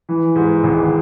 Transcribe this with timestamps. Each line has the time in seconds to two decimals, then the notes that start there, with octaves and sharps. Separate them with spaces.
0.09 E3
0.35 G#2
0.64 G#1